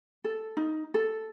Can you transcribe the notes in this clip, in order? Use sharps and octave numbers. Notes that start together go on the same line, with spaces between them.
A4
D#4
A4